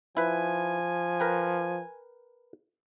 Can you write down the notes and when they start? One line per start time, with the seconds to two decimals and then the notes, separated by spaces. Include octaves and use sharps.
0.17 F3 E4 B4 G#5
1.20 A#4 B4 G5